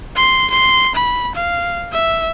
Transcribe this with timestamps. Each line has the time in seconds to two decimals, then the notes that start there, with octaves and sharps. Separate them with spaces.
0.16 C6
0.50 C6
0.95 B5
1.35 F5
1.92 E5